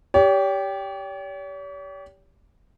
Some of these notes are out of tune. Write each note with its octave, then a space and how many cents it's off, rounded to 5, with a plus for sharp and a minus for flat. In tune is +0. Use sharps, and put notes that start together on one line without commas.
G4 +0 C#5 +45